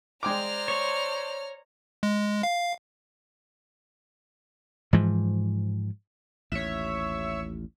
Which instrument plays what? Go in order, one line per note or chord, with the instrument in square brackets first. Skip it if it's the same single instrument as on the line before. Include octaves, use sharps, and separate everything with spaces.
[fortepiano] G#3 G5 D6 [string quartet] C5 D5 [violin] A#5 F6
[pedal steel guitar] C#5
[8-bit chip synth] G#3
F5
[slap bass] G#2 E3 F3
[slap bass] A1 D#2 [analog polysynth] C#5 E5